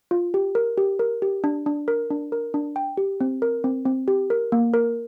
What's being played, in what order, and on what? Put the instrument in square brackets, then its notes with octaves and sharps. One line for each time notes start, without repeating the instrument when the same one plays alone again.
[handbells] F4
G4
A#4
G4
A#4
G4
D4
D4
A#4
D4
A#4
D4
G5
G4
C4
A#4
C4
C4
G4
A#4
A#3
A#4